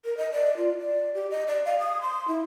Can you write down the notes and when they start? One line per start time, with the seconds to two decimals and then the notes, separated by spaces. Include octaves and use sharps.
0.05 A#4
0.17 D#5
0.32 D5
0.57 F4
0.78 D5
1.14 G4
1.30 D#5
1.48 D5
1.65 F5
1.79 D#6
2.01 C6
2.28 E4